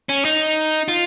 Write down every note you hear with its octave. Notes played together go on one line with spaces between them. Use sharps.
C#4
D#4
F4